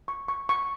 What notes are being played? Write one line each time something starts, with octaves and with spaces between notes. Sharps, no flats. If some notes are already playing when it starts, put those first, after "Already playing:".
C#6
C#6
C#6